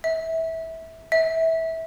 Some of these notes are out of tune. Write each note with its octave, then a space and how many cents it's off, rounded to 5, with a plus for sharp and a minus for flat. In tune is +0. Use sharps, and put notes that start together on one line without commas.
E5 -20
E5 -20